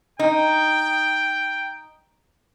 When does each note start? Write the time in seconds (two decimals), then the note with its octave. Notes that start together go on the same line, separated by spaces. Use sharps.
0.19 D#4 G5